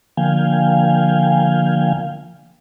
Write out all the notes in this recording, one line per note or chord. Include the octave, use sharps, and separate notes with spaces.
D3 F3 A#3 F5 G5 G#5